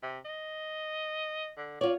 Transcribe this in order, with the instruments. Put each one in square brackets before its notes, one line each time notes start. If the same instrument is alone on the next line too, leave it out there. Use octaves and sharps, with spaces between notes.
[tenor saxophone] C3
D#5
D3
[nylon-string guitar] F4 C#5 [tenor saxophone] D5